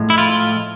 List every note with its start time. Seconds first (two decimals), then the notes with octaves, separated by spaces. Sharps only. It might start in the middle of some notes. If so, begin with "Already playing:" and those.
Already playing: A2 F3 G#3
0.10 E4
0.18 F4